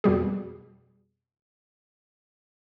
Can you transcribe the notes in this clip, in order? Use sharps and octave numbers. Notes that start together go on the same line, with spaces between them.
F2 B2 G3 G#4